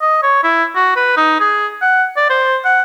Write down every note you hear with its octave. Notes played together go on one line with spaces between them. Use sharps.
D#5
C#5
E4
F#4
B4
D#4
G#4
F#5
D5
C5
F#5